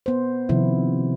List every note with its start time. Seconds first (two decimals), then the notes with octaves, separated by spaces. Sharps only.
0.06 B3 C5
0.49 C3 D#3 F3 E4